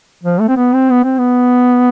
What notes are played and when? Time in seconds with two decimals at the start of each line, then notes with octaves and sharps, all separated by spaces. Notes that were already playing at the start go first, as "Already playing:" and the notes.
0.23 F3
0.40 A3
0.49 C4
0.57 B3
0.74 C4
0.91 B3
1.04 C4
1.18 B3